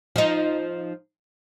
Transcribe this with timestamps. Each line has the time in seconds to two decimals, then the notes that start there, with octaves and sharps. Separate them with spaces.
0.16 F3 D#4